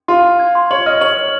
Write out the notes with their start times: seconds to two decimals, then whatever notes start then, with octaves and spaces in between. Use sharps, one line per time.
0.08 F4 C6
0.23 C6
0.39 G#6
0.55 C6
0.71 C#5 F#7
0.86 D#5 F6
1.01 C#5 F#7
1.17 F6